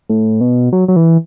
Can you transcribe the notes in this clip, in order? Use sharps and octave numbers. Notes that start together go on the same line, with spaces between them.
A2
B2
F#3
F#3
E3